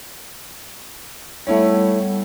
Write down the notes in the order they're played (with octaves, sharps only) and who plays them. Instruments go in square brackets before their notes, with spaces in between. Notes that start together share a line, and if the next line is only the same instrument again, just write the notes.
[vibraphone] G3 B3 F#5 [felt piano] A3 E4 C#5